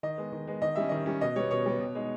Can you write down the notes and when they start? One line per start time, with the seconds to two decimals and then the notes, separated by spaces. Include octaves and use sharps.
0.03 D#3 D#5
0.18 G#3 B3
0.32 D#3
0.47 G#3 B3
0.62 D#3 D#5
0.75 G3 C#4 E5
0.89 D#3 D#5
1.06 G3 C#4
1.21 B2 D#5
1.36 G3 B3 C#5
1.51 B2 C#5
1.66 G3 B3
1.80 B2
1.95 G#3 D#4